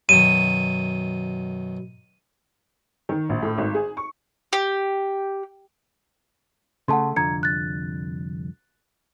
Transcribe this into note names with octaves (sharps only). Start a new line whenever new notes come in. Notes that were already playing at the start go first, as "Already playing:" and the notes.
F#2 B2 D#3 D#7
D#3
A#1
A2
G#1
G#4
C#6
G4
C#3 A3 F#5 A5 C6
C2 F2 D3 A#5 G#6 C#7
F#6 A6